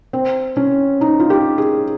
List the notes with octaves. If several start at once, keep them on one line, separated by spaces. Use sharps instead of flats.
C4
C#4
D#4
F4
G4
G#4